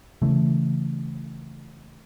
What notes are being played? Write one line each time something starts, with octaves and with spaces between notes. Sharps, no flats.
C#3 E3 A3